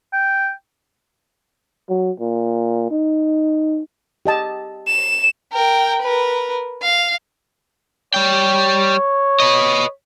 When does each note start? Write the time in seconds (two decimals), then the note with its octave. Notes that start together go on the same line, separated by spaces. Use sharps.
0.13 G5
1.89 F#3
2.20 A#2
2.91 D#4
4.26 G4 D#5 A5
4.87 E7
5.53 A#4 G5
6.01 A#4 B4
6.82 F5
8.14 G3 C#5 G5
9.40 B4 D#5